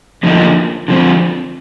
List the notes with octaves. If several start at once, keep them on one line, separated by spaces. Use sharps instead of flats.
F2 D3 F3 A#3 D#4
D3 F3 C4